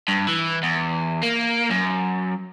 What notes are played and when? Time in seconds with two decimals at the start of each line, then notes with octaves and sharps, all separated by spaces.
0.08 G2
0.28 E3
0.63 E2
1.23 A#3
1.70 F#2